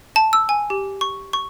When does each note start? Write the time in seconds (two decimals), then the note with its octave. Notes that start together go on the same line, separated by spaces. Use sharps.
0.16 A5
0.33 E6
0.49 G#5
0.70 G4
1.01 C#6
1.33 C#6